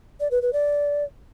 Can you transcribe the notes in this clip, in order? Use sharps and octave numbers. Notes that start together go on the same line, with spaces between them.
D5
B4
B4
D5